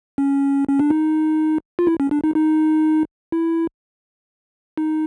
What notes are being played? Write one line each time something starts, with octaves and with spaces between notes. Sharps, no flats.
C#4
C#4
D4
D#4
F4
E4
C#4
D4
D#4
D#4
E4
D#4